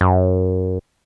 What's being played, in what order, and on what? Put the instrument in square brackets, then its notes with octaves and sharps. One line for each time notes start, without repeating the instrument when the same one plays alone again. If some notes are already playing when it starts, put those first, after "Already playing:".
[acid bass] F#2